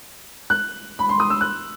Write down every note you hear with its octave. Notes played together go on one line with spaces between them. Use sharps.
F#6
B5
C6
D#6
E6
F#6